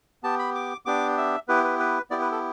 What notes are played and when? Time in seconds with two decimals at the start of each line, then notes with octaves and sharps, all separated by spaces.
0.23 B3 G4 A5
0.39 B5
0.55 D6
0.86 B3 D4 G4 D6
1.18 E5
1.48 B3 E4 G4 B4
1.64 B4
1.80 B4
2.10 B3 E4 G4 D5
2.21 B4
2.32 A4